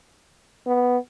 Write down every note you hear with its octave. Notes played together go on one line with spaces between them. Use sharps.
B3